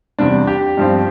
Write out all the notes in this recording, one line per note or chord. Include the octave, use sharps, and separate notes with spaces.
E2 C3 G3 C4 D4
G4
G2 F3 C4